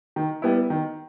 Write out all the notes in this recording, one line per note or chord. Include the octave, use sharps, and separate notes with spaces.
D#3
G3 B3 E4
D#3